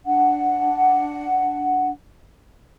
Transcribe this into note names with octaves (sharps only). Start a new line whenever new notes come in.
D4 F#5